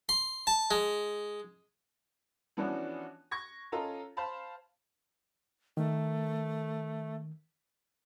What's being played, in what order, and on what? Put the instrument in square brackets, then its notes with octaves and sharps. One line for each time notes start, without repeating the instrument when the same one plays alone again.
[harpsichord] C6
A5
G#3
[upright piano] E3 F3 B3 C#4 D4 F#4
C#6 G#6 A#6
C#4 F4 A4 D#5 A#5
C5 F5 A5 B5
[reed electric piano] D#3 [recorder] A3